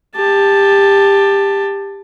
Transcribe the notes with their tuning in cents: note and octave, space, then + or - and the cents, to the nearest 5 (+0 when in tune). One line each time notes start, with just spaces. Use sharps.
G4 +20 A5 +0